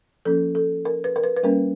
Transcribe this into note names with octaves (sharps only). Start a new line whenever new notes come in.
F3 A#3 C#4 A4
A4
A#4
B4
A#4
B4
B4
G3 A#3 C#4 A#4